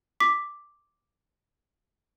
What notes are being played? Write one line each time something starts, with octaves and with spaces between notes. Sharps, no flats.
D6 B6